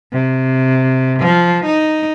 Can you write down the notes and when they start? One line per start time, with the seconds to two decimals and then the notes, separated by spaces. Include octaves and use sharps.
0.12 C3
1.20 F3
1.66 D#4